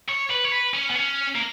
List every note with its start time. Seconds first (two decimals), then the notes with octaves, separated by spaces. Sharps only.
0.09 C#5
0.30 B4
0.45 C#5
0.52 B4
0.74 C#4
0.90 B3
0.95 C#4
1.35 A#3